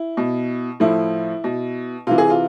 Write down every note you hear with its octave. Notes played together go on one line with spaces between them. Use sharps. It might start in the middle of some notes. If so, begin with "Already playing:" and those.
Already playing: E4
B2
A2 F3 E4
B2
C3 E3 F4
G#4
F4